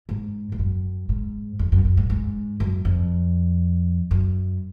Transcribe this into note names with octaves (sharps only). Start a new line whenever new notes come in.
G#2
G#2
F#2
G#2
F2
F#2
F#2
G#2
G#2
F#2
F2
F#2